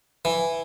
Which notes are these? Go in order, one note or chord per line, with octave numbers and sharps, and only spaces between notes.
E3